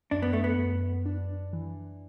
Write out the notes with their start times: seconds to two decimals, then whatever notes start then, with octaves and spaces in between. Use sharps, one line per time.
0.11 F#2 D4
0.22 B3
0.33 A3
0.44 B3
0.58 F#2
1.06 D4
1.53 E3